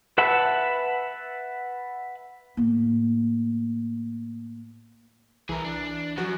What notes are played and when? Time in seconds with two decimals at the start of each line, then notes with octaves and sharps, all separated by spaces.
0.18 B4 E5 F#5 A5 B5
2.57 A2 A#3
5.49 C2 E3 G#4 A#4
5.65 D4
6.18 F#2 F3 F#4